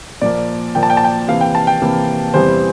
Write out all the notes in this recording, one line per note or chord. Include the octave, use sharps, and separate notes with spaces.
A#2 F3 A#3 D5
A#2 F3 A#3 G5
A5
G5
A5
G5
C3 E3 A#3 F5
G5
A5
G5
C3 E3 A#3
E2 C3 E3 G3 C5